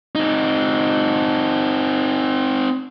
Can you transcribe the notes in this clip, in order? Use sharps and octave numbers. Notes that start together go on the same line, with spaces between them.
C4 D#4